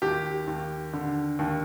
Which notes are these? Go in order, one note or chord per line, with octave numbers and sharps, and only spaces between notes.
D#2 G4
D#2
D3
D#2